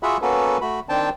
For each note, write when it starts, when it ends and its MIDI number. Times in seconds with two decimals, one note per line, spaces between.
0.03 0.17 65
0.03 0.17 66
0.03 0.17 68
0.03 0.17 76
0.03 0.17 78
0.03 0.17 83
0.22 0.58 58
0.22 0.58 59
0.22 0.58 61
0.22 0.58 66
0.22 0.58 69
0.22 0.58 71
0.61 0.80 57
0.61 0.80 66
0.61 0.80 83
0.89 1.09 51
0.89 1.09 60
0.89 1.09 62
0.89 1.09 79
0.89 1.09 81